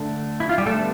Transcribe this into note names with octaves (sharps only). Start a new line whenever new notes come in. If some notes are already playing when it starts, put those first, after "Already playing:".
Already playing: D3 A3 D4
E4
F4
G3 G4
A3 A4
D3 G3 B3 D4